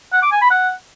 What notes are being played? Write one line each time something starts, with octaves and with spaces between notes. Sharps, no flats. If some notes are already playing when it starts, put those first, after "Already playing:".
F#5
D6
G#5
B5
F#5